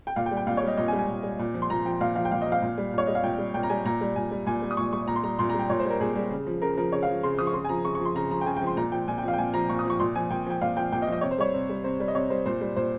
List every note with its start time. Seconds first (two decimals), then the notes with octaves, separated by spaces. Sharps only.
0.07 G5
0.16 A#2 F5
0.26 G5
0.31 G3
0.37 G5
0.47 A#2 F5
0.57 C#5
0.63 G3 D#5
0.77 A#2 D#5
0.88 G#5
0.93 G3
0.99 G#5
1.08 A#2
1.23 G3
1.39 A#2
1.54 F3
1.62 C6
1.70 A#2 A#5
1.85 F3 G5
2.00 A#2 F5
2.16 F3 F5
2.25 G5
2.31 A#2 F5
2.42 D#5
2.47 F3
2.52 F5
2.62 A#2
2.78 G3
2.93 A#2 C#5
3.07 G3 D#5
3.15 F5
3.23 A#2 G5
3.38 G3
3.54 A#2 G5
3.63 A#5
3.70 G3 G#5
3.85 A#2 A#5
4.01 G3
4.16 A#2 G#5
4.31 G3
4.46 A#2 G#5
4.62 G3
4.71 D#6
4.77 A#2 C#6
4.93 G3 C#6
5.08 A#2 A#5
5.16 C6
5.23 G3 A#5
5.39 A#2 C6
5.49 A#5
5.54 G3
5.59 G5
5.70 A#2 C#5
5.79 C5
5.85 G3
5.90 A#4
6.00 A#2 G#4
6.16 G3
6.31 C#3
6.47 F3
6.62 C#3 A#4
6.77 F3 A#4
6.92 C#3 C#5
7.03 F5
7.08 F3
7.23 C#3 C6
7.38 F3 D#6
7.47 C#6
7.54 C#3 C6
7.65 G#5
7.69 F3 A#5
7.84 C#3 C#6
7.95 C#6
8.00 F3
8.05 C6
8.16 C#3 A#5
8.31 F3 A#5
8.41 G5
8.46 C#3 G#5
8.57 G5
8.62 F3
8.67 C6
8.77 A#2 A#5
8.92 F3 G5
9.08 A#2 G#5
9.18 G5
9.23 F3 F5
9.33 G5
9.38 A#2 G#5
9.54 F3 A#5
9.69 A#2 C#6
9.79 D#6
9.85 F3
9.90 C#6
10.00 A#2 C6
10.15 F3 G#5
10.30 A#2 G5
10.46 F3 G5
10.61 A#2 F5
10.77 F3 G5
10.92 A#2 G5
11.02 D#5
11.07 F3
11.12 D#5
11.21 C3 C#5
11.31 C5
11.38 G3 C#5
11.54 C3
11.70 G3
11.84 C3 C5
12.00 G3
12.08 D#5
12.15 C3 C#5
12.30 G3 C5
12.46 A#2 C5
12.61 G3
12.76 A#2 C5